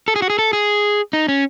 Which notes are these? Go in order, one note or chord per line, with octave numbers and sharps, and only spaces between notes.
A4
G#4
F#4
G#4
A4
G#4
D#4
C#4